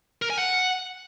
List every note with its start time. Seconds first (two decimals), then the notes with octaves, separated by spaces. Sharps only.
0.22 A#4
0.30 G#5
0.38 F#5